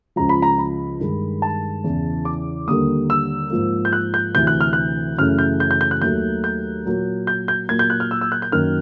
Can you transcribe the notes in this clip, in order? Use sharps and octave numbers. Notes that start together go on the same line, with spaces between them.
C#2 C#3 F3 A#5
B5
A#5
B5
G2 D#3 G#3
A5
E2 C#3 E3
D6
D#2 D3 G3 A#3 D#6
E6
G#2 F3 A#3
G6
F#6
G6
D2 C3 E3 G6
F#6
F6
F#6
F#2 C#3 E3 A3 F6
G6
G6
G6
G6
F#6
D#2 D#3 F#3 A3 G6
G6
A#2 F#3 A#3
G6
G6
A#2 F#3 A#3 G#6
G6
F#6
F6
E6
E6
F#6
G6
F#2 D#3 F#3 A#3 F6